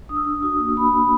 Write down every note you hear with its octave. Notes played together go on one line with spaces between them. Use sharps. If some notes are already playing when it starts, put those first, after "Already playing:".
D4 D#6
E6
D4 D#6
F#4 D#6
A#3
A#3 B5
A#3